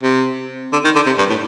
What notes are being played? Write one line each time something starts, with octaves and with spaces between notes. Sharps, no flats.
C3
D3
D#3
D3
C3
G2
A2